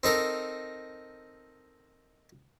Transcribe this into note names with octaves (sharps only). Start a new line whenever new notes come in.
C4 D#4 A4 A#4